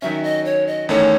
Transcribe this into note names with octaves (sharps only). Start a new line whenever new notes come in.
D#3 F#3 C#4 E5
D#5
C#5
D#5
E2 D#3 A3 C#4 C#5